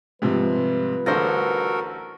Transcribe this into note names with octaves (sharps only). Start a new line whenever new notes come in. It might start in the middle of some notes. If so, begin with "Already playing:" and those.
G#2 C3 F3 G3 F4 B4
A1 D3 F#4 A4 A#4 C5 A#6